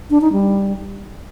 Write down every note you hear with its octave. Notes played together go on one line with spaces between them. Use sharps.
D4
D#4
G3